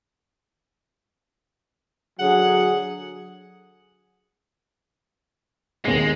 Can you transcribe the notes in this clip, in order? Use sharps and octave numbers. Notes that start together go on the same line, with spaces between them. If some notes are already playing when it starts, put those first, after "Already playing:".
D3 F#3 G#4 F#5
D#2 G#3 C7